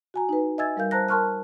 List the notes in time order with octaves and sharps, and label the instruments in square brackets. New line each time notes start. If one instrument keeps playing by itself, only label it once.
[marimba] F#4 G#5 A#5
D#4 B4
D#5 E5 G#5 E6 G#6 A6
G3 A#4 F5 G6
C5 A5 A#5 F#6 A#6
A#4 A5 C6 C#6 F6 F#6